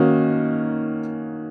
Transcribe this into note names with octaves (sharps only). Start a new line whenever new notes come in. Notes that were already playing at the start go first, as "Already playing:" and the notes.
Already playing: D#3 A#3 C#4 F#4